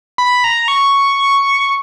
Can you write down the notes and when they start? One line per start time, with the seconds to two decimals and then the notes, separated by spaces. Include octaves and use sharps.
0.18 B5
0.44 A#5
0.68 C#6